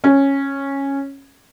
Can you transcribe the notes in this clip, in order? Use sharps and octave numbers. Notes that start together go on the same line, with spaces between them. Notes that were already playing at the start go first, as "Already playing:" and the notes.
C#4